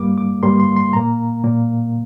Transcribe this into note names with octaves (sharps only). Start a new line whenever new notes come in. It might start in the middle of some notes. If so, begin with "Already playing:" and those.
Already playing: G2 G3 A#3 D6
D6
G2 G3 A#3 C6
C6
C6
A#2 A#3 A#5
A#2 A#3